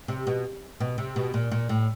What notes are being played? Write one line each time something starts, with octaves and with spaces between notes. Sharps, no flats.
C3
B2
B2
C3
B2
A#2
A#2
A2